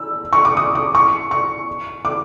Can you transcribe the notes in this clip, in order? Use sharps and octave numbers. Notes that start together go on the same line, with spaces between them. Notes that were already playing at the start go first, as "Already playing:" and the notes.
Already playing: E6
C#6
D6
D#6
D6
C#6
C#6
D6